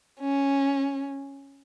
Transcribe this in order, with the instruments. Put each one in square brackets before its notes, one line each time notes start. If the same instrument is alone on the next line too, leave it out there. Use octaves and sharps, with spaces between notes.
[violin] C#4